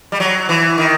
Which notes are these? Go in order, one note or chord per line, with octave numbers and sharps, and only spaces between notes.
G3
F#3
E3
D#3